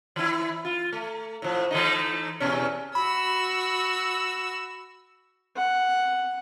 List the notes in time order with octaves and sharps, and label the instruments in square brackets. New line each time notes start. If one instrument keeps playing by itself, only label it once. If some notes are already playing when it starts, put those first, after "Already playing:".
[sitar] E3 E4
F4
A3
A2 F3
E3 A3 D#4
E2 B2 C#4
[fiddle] F#4 E6 [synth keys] B5
[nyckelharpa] F#5